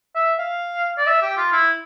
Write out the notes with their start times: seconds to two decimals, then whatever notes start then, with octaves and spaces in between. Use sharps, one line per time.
0.15 E5
0.38 F5
0.98 D5
1.06 E5
1.22 G4
1.37 F4
1.53 E4